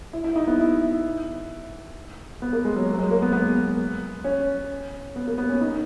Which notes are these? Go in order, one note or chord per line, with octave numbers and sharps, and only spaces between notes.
E4
E4
D#4
B3
E4
B3
A#3
G#3
F#3
F#3
G#3
A#3
B3
B3
C#4
B3
A#3
B3
C#4
D#4